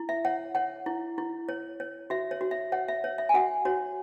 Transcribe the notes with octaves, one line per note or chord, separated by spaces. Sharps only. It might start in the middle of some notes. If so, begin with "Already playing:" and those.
Already playing: E4
E5
C#5 F#5
C#5 F#5
E4
E4
C#5
C#5
F#4 E5
C#5
F#4
E5
C#5 F#5
E5
C#5
E5
G#5
F#4 F#5
F#4 C#5